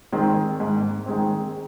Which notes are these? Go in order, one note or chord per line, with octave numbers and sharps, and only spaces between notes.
D#3 G#3 C4
G#2
D#3 G#3 C4